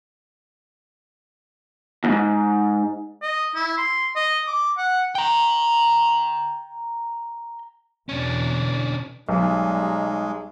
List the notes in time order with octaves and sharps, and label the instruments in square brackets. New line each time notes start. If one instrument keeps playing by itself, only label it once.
[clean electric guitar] E2 G#2
[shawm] D#5
E4
C6
D#5
D6
F#5
[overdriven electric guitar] G5 A#5
[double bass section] E2 B2 D3 [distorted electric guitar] C#4 D4
[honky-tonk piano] B1 [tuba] G3 [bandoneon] G#3 [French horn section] D#4